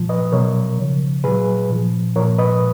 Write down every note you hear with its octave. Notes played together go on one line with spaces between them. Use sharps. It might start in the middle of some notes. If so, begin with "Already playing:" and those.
Already playing: A#2 F3
B4 D#5
B2 F#3 A#4 C#5
C#3 F3
A#2 F#3 G#4 B4
A#2 F3
A#2 F3 A#4 C#5
B4 D#5